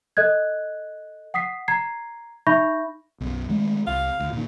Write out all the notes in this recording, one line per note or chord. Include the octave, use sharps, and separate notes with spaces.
A4 D#5 F#6 G#6
F#5 D#6 B6 C7
A#5 G#6 C7
D#4 E5 B5 C#6 G6 A#6
B1 F#2
D#3 G#3 A3
C2 F5
D2
A#2 D#3